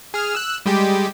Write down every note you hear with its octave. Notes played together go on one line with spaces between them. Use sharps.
G#4 F6
E6 F#6
G3 G#3 G4